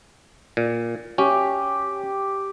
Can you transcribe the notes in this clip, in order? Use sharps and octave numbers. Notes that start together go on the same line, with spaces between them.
A#2
C#4 G4